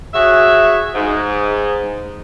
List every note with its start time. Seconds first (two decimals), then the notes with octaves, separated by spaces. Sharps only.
0.14 F#4 G#4 C#5 E5
0.95 G#2